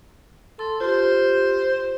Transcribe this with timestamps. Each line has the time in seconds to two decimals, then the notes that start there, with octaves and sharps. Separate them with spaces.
0.59 A4 C6
0.80 F4 G4 C5